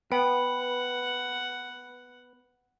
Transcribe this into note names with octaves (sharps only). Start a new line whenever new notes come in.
B3 B4 F#5 G5